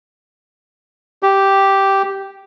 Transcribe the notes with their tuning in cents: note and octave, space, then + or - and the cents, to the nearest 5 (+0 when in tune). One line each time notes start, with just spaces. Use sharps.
G4 -5